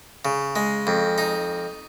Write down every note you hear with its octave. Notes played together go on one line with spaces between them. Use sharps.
C#3
G#3
F2
D#4